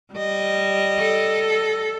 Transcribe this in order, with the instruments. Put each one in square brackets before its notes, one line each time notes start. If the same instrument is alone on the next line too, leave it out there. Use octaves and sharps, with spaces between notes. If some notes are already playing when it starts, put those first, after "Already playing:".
[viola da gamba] G3 D#5
[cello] A4